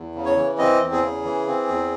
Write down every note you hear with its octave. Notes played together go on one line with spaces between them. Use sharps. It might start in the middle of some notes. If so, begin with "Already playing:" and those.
Already playing: E2
C#3
C#5
E3
C4 D#5
E2
G#4
C#3
E3
C4
E2